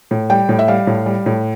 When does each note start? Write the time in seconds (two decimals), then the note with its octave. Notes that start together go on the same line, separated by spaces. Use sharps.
0.11 A2
0.30 G3 G5
0.49 A2
0.59 E5
0.68 G3 F5
0.87 A2
1.06 G3
1.26 A2